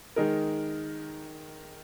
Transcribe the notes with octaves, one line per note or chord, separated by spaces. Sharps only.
D#3 G#3 D#4 A#4